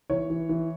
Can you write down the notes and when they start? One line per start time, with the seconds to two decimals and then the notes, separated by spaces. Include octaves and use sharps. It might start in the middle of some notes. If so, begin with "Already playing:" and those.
0.10 E3 C#5
0.30 E3
0.49 E3